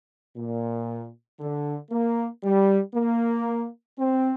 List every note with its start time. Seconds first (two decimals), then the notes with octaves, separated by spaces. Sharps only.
0.35 A#2
1.39 D3
1.90 A#3
2.43 G3
2.94 A#3
3.98 C4